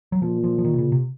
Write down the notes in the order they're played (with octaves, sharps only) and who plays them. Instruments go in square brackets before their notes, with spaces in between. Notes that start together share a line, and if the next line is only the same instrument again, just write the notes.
[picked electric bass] F#3
[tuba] A#2 [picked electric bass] F3
[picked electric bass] F3
F3
D#3
C3
C#3
C3